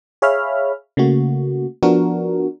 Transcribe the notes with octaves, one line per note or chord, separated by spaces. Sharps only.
G#4 C#5 E5 F5 B5 F6
C#3 A3 A#3 F#4
F3 B3 D4 F#4 A#4